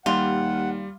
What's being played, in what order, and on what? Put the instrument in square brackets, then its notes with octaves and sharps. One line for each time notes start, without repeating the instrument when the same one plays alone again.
[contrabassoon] D#2 [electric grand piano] G3 [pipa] F4 [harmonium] F#5